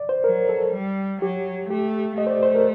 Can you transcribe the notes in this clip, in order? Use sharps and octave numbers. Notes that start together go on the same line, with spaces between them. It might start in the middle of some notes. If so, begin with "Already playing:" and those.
Already playing: D5
C5
F#3 A#4
A4
G3
F#3 G4
A3 G4
A3 D#5
C5
D5
C5
A#4